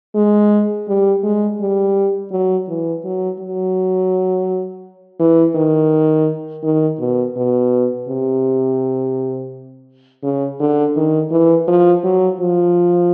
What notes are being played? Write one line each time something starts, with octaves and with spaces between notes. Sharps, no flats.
G#3
G3
G#3
G3
F#3
E3
F#3
F#3
E3
D#3
D#3
B2
B2
C3
C#3
D3
D#3
E3
F3
F#3
F3